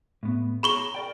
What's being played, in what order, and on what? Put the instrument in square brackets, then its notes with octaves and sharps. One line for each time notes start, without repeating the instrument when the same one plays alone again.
[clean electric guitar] A2 B3
[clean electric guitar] G#4 C#5 A#5 [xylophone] B5 C#6 G7
[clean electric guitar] A#4 D5 G5